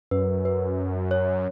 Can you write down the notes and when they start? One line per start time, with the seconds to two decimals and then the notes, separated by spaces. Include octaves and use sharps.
0.11 F#2 B4
0.45 B4
1.11 C#5